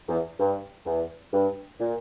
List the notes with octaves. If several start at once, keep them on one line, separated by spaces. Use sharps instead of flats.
E2
G2
E2
G2
A#2